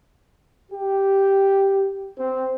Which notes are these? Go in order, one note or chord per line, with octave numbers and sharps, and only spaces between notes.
G4
C4